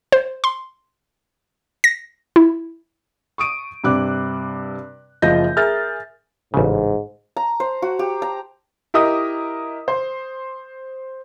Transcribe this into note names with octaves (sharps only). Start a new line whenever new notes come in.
C5
C6
A#6
E4
C#6 D#6 D7 D#7
G2 C3 D6 F#6
F#1 F3 D#5 G6 A#6
G#4 A#4 E5 F6 G6 A6
A1 G#2 C#3
A#5
C5
F#4
G4
A#5
E4 G4 A#4 D#5 D#6
C5